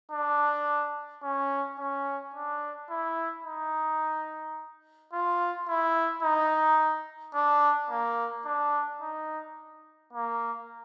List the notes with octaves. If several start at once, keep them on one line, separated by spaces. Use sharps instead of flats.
D4
C#4
C#4
D4
E4
D#4
F4
E4
D#4
D4
A#3
D4
D#4
A#3